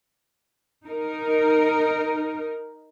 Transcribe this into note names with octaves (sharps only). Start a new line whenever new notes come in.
D#4 A#4